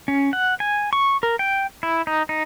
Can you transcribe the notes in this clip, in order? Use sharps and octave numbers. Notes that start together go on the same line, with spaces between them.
C#4
F#5
G#5
C#6
A#4
G5
E4
D#4
D#4